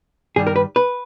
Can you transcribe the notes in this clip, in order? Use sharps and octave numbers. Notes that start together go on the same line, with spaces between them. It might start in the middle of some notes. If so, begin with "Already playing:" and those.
G2 D#3 G3 G#4
A#4
B4
B4